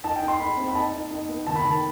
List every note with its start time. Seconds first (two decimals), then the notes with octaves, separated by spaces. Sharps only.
0.04 D#4 A5
0.16 G5
0.22 D#4
0.28 C6
0.39 D#4 B5
0.57 C4
0.68 B5
0.75 D#4 A5
0.93 D#4
1.11 D#4
1.29 B3
1.47 D#3 A5
1.56 B5
1.65 D#3 A5